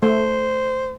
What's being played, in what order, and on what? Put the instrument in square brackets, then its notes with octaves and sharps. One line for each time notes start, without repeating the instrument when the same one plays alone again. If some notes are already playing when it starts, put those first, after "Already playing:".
[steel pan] A3 [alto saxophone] C5